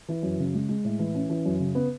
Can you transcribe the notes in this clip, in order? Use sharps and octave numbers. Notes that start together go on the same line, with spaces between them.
E3
F#2
C#3
G#3
G#3
A2
E3
C#4
E3
F#2
C#3
B3